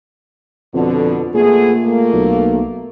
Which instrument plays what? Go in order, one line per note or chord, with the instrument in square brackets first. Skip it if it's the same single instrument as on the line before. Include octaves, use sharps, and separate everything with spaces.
[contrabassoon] F2 [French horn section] B2 D3
[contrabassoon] A#2 [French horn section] A3 B3 G#4
[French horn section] A3 A#3
[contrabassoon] B1